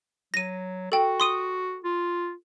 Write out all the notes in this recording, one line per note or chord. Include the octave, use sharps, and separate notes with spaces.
F#3 A#6 D#7
F#4 A4 G5
C6 D#6 D#7
F4